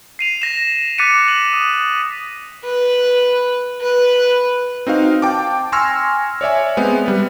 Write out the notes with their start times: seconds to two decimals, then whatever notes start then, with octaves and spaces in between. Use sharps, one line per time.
0.19 C7 D#7 F7
0.42 A#6 E7
0.98 D6 F#6 A6 B6 C#7 D#7
1.28 F#7
1.53 D#6
2.65 B4
3.81 B4
4.87 C4 D#4 F#4 F5
5.22 G5 A5 D6
5.72 G#5 C6 C#6 E6 F6 A#6
6.41 C#5 D5 E5 G#5
6.77 G#3 B3 C4
7.06 G3 B4